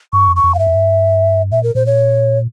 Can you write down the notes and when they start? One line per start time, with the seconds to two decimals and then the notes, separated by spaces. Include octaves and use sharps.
0.13 G2 C#6
0.28 F2
0.36 C#6
0.44 F2
0.54 F5
0.59 G2 E5
0.67 F2
0.75 G2
1.52 A#2 E5
1.63 A#4
1.75 A#2 C5
1.86 C#5